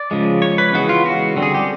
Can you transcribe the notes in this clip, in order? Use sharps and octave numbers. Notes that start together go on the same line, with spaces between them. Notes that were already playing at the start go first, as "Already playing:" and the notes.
Already playing: D5
C#3 F3 G#3
C#5
B4
C#3 E3 G#3 B3 F#4
F4
F#4
D3 G3 C4
G#4
G4